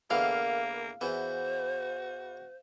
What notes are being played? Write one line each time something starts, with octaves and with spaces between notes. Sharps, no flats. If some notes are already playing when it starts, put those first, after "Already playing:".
E2 D3 E3 A#3 A#4 F5
E2 E3 F#4 C5